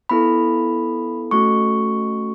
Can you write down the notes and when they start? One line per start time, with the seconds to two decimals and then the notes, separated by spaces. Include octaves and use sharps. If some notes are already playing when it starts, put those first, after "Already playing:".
0.09 B3 E4 A4 B5
1.31 A3 C#4 F#4 A4 C#6